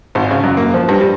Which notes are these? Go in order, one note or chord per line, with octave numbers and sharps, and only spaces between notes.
G#1
C#3
F#2
A#3
F3
G2
G3